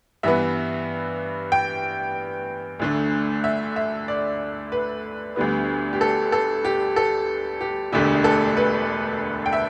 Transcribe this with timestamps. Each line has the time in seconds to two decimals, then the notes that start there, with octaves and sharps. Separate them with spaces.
0.23 G2 E3 B3 E5
1.52 G5
2.79 D2 D3 A3
3.44 E5
3.76 E5
4.08 D5
4.72 B4
5.36 D2 D3 G3 B3
5.93 G4
6.01 A4
6.32 A4
6.65 G4
6.96 A4
7.61 G4
7.93 E1 D2 D3 A3 G4
8.24 A4
8.57 B4
9.46 G5
9.53 E5